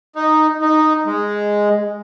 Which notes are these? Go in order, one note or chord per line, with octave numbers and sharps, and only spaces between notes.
D#4
D#4
G#3